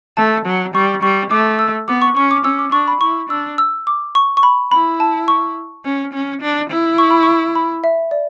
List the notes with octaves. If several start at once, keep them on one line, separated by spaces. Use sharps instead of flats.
A3 A5
F#3
G3 C#6
G3 C#6
A3 D6
E6
B3 D6
C#6
C#4 C#6
D6
C#4 E6
D6
D4 C#6
B5
E4 C#6
D4 E6
E6
D6
C#6
C#6
B5
E4 B5
A5
C#6
C#4
C#4
D4
E4
C#6
B5
C#6
B5
E5
D5